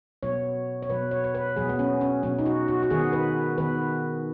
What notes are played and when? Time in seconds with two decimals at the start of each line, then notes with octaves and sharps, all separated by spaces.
0.23 B2 F#3 B3 C#5
0.83 C#5
0.89 B2 F#3 B3 B4
1.11 C#5
1.24 C#5
1.35 B4
1.56 B2 F#3 B3 G#4
1.69 B3
1.79 C#4
2.01 C#4
2.23 B2 F#3 B3 C#4
2.39 D#4
2.46 F#4
2.68 F#4
2.83 F#4
2.91 D#3 B3 G#4
3.13 B4
3.58 D#3 B3 B4